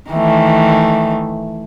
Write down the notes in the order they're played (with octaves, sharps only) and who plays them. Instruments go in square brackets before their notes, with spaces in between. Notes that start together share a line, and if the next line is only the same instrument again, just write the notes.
[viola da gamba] D#3 E3 A3